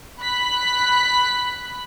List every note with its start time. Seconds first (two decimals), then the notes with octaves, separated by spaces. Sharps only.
0.22 B5 F#6 B6